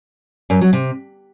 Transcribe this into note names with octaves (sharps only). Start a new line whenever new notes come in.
F#2
F#3
C3